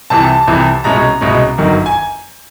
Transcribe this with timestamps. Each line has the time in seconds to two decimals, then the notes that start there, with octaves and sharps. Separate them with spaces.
0.10 C2 C3 E3 A5
0.47 C2 C3 E3
0.84 C2 B2 G#3 C#4 A#5
1.21 C2 B2 G#3 C#4
1.58 G1 F#2 D#3 F#3
1.86 G#5